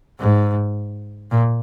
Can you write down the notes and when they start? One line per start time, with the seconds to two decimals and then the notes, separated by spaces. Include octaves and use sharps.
0.19 G#2
1.31 A#2